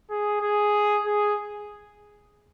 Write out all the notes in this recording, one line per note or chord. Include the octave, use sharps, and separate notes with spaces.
G#4
G#4
G#4